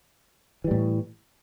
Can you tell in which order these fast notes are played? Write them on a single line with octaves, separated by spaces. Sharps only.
E3 G3 A2